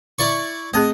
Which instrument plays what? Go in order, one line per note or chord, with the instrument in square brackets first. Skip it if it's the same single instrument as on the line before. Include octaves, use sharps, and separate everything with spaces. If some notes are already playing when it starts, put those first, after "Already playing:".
[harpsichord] E4 D5 C#6
[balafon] A3 C4 G#4 [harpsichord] D#5